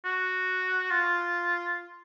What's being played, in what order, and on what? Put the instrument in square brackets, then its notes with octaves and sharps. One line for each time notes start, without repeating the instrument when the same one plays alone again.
[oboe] F#4
F4